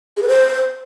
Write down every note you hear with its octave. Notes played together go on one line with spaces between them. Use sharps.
G#4
B4
C5